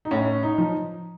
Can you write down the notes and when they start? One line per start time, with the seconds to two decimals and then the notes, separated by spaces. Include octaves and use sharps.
0.05 D#4
0.11 A2 C#4
0.43 D#4
0.58 F3